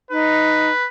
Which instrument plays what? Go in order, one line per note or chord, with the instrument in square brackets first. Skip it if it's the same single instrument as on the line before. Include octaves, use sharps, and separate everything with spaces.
[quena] D#4 [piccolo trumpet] B4